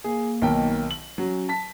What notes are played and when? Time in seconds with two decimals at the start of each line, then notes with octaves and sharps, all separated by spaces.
0.04 A#3 G#4
0.42 B1 D#3 G5
0.91 F#7
1.18 F#3 C#4
1.49 A5 B6